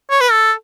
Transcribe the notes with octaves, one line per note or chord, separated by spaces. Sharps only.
C#5
B4
A4